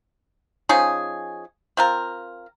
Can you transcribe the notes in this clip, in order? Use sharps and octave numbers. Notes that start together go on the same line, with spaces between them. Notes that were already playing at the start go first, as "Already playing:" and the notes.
F3 C#4 D#4 G#4
C4 F4 A#4